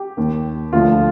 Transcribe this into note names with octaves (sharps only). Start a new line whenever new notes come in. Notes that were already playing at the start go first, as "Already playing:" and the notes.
Already playing: G4
D#2 D#3
D2 D3 F3 F4